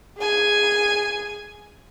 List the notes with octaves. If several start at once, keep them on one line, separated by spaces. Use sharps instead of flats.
G#4 G#5